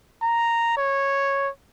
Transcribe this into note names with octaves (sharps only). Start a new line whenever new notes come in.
A#5
C#5